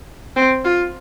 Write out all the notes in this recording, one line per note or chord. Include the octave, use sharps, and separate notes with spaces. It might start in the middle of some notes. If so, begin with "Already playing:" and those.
C4
F4